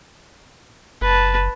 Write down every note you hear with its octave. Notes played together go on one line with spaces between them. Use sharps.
F#1 B4 A5